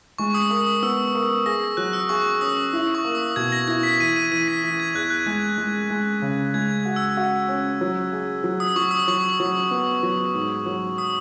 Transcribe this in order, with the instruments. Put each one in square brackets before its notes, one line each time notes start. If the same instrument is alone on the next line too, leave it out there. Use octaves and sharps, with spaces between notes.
[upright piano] G#3 [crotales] C#6
[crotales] D#6
[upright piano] A#4 [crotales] D#6
[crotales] D#6
[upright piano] B3 [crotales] E6
[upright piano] A#4
[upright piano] G#4 [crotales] A#6
[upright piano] F#3 [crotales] F#6
[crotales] E6
[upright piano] G#4 [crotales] C#6
[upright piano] C#4 [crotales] D#6
[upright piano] E4
[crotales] C#6
[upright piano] A#3
[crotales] D#6
[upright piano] B2 [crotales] G#6
[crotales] A#6
[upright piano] E4 [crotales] G#6
[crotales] B6
[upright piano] E3 [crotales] D#7
[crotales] D#7
[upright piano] E3 [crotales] D#7
[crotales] B6
[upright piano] E3
[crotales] G#6
[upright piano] E2 [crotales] F#6
[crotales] F#6
[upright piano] G#3 [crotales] G#6
[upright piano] G#3
G#3
C#3
[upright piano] G#3 [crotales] G#6
[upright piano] F#4
[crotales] E6
[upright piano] F#4
C#4
F#3
G#4
F#3
[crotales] D#6
[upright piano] F#3 [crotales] C#6
[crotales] D#6
[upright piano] F#3 [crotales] C#6
[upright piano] F#3
B3
F#3
G#2
F#3
[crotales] D#6